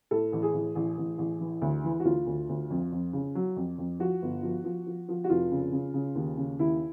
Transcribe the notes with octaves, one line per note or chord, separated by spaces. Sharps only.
A2 A4
A1
G#4
A1
A1
A1
A1
E3
D2
E3
F#4
D2 F4
D2
D2
F2
F2
C#3
F#3
F2
F2
F3 F#4
G1
F3
F3
F3
F3
F#4
F1 F4
C#3
C#3
C#3
D#2
C#3
D#2 E4